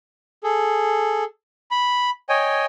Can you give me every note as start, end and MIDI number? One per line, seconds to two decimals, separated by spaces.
0.44 1.24 68
0.44 1.24 69
1.71 2.10 83
2.29 2.66 73
2.29 2.66 75
2.29 2.66 79
2.29 2.66 80